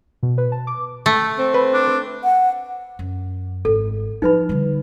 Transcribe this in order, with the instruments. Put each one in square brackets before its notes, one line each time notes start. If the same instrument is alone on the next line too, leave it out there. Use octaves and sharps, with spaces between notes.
[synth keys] B2
B4
A5
D6
[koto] A3
[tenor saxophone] C4
[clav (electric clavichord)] B4
[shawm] D4
[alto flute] F#5
[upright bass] F#2
[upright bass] G#1 [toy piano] A4
[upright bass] F3 F#3 [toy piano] D#4 B4 B5
[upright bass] D3 G3